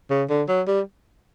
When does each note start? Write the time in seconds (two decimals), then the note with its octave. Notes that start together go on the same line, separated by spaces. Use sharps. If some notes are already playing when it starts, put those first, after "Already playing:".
0.10 C#3
0.29 D3
0.48 F#3
0.67 G3